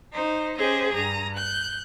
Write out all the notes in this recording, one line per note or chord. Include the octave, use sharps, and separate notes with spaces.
D#4 C5
C#4 G4 G#4 C5 D#5
G2 A#5 D#6
F#6 G6